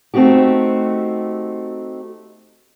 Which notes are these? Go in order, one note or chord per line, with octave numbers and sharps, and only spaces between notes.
A3 C4 D#4 F#4 G4